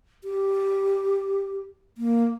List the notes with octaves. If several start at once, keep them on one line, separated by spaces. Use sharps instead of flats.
G4
A#3